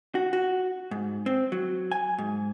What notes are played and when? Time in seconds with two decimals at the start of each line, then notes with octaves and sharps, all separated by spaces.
0.15 F#4
0.33 F#4
0.91 G#2
1.26 C4
1.52 F#3
1.91 G#5
2.18 G#2